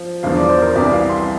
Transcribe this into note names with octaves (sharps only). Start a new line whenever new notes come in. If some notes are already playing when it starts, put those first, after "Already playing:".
Already playing: F3
E2 D3 F3 F5
D5
C5
A#4
C2 C3 E3 D5
F5
C6